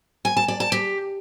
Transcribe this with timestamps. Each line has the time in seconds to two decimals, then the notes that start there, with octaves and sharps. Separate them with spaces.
0.25 G#5
0.37 A5
0.48 D5
0.60 A5
0.72 G4